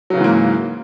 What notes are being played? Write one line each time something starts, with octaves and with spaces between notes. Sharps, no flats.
G#2 C#3 E3 F#3 A#3